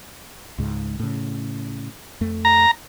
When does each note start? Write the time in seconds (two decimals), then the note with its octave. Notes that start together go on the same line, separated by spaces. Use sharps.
0.58 C#2 G#2
0.99 A2 C#3
2.21 F2 A3
2.45 A#5